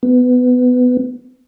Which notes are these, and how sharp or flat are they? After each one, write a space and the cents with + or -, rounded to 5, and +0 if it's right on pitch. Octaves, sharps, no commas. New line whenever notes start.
B3 +15